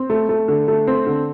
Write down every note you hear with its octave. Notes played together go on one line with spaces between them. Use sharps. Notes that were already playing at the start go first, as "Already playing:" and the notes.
Already playing: C4
A3
A3
D3
A3
C4
D3